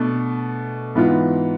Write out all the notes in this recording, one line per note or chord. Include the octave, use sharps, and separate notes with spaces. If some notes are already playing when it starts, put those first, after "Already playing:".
Already playing: B2 A3 D4
G#2 E3 B3 F4